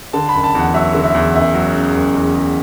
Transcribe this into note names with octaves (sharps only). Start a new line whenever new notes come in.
D3 A5
B5
F#1
A5
E2 F#5
F#3 E5
D3
E5
E2
F#1 E5
F#3
C#3
F#1
E2
E2